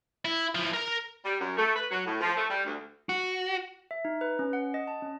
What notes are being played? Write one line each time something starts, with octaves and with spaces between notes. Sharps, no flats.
E4
E3 F3
A#4 A#5
G3
F#2
A3
B4
F#3
A2
F3
A3
G3
D2
F#4
E5
D#4
B4
C#4
F#5
D#5
A5
C#4